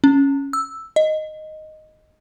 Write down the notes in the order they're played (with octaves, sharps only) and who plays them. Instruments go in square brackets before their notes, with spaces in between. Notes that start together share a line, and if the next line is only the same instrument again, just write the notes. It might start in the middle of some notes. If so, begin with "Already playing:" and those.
[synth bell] C#4
E6
D#5